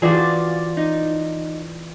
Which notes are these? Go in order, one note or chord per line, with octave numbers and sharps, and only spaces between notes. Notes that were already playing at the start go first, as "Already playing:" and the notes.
E3 F4 F#4 G#4 D5
D#4